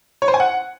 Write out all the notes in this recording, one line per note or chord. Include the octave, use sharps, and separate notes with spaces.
C#5
C5
G#5
F#5